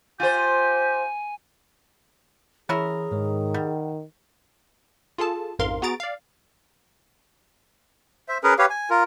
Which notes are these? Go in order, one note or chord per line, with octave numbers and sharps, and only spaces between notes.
F4 G4 C5 G#5
E3 C#4 E4 G#4 A#4
G#2 D#3 G#3 C#5
G3 F#5
F4 G#4 A4 A5
A1 F2 G#2 A#4 F5 C6
B3 F#4 G#4 A#5 A6 D7
D5 F5
C5 E5
C#4 G#4 A#4 B4
G4 B4 C#5 F5
G#5
F4 A#4